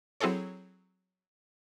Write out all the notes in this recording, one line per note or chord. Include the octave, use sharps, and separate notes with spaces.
F#3 C4 E4 G#4 A4 C#5